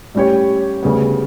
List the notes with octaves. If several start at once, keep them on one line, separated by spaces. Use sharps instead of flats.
A2 G3 C#4 G4 C#5
D2 C#3 G3 B3